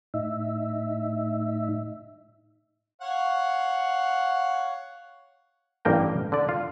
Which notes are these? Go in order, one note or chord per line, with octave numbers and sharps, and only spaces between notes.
A2 D#4 E5
C#5 F5 F#5
A1 G2 A#3 G5 A#5
D3 D5
F4